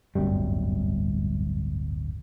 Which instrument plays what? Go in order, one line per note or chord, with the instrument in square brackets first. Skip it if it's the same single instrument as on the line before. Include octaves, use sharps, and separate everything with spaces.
[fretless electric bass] D1 G1 F#2 G3